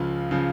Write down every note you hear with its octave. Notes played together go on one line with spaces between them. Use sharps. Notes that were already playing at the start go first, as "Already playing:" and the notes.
Already playing: C#2 C#3 F3 F4
C#3 F3